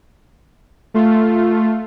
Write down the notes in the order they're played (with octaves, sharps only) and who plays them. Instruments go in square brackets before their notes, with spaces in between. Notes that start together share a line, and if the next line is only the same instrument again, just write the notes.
[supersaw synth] A3 F4